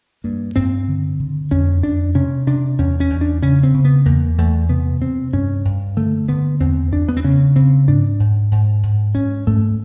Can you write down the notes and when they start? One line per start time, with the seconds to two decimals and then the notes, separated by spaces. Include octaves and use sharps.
0.24 G2 A#3
0.56 G2 C4
0.88 D3
1.20 D3
1.51 F2 C#4
1.83 F2 D4
2.15 C3 C#4
2.47 C3 D4
2.78 E2 C#4
3.00 C#4
3.10 E2
3.21 D4
3.42 C#3 C#4
3.63 C4
3.74 C#3
3.85 B3
4.06 E2 A#3
4.38 E2 A3
4.69 C3 B3
5.01 C3 C4
5.33 G2 C#4
5.65 G2
5.97 D3 A3
6.28 D3 B3
6.60 E2 C4
6.92 E2 D4
7.09 B3
7.17 C4
7.24 C#3 C#4
7.56 C#3 C4
7.88 G#2 D4
8.20 G#2
8.51 G#2
8.83 G#2
9.15 G#2 C#4
9.47 G#2 A3